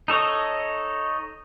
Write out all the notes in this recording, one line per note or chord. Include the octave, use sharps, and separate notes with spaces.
D#4 A4 C#5 D#5